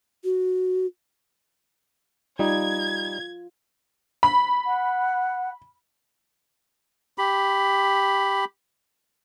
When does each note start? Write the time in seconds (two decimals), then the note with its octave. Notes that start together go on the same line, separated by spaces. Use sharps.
0.24 F#4
2.39 G3 D#4 F4 G#6
4.23 B5
4.66 F#5
7.18 G4 B5